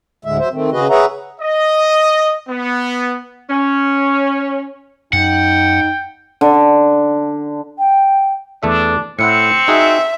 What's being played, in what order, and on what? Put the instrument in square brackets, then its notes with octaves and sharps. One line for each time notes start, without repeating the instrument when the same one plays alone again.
[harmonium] D2 A2 D3 G#3 E5
F#3 C5 E5
D#3 A3 C4
C#3 F#4 G#4 B4 D#5
G#4 B4 C#5 E5 F#5 A#5
[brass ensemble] D#5
B3
[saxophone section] C#4
[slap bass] F#2 [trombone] D#4 [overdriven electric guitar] F#5 [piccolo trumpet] G5
[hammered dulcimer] D3
[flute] G5
[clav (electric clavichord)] E2 A3 E5 [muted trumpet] D4
[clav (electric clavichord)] A2 E4 F#5 [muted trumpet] C4 [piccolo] C#7
[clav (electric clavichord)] D#4 F#4 G#4 [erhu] E5